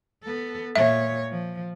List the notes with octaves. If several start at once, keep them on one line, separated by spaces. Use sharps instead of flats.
B3 A4
A#2 C#5 E5
F3